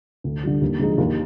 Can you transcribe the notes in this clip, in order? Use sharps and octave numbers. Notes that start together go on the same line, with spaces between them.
D2
D3 G3
D#2
D3 F3 G#3 D#4
D#2